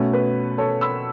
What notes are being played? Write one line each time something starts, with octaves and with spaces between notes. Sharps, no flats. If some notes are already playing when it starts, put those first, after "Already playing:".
Already playing: B2 A3 C#4
B4
A4 C#5
B5 E6